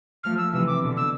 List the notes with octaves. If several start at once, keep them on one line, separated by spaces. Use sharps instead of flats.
F3 A3 F6
E6
C3 E3 E6
D6
B2 D3
E6